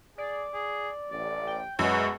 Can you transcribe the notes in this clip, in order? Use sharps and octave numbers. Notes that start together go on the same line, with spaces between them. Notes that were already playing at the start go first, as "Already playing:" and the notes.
G#4 D5
G#4
A1 D5
G5
F#2 B2 G#3 F#4 C#5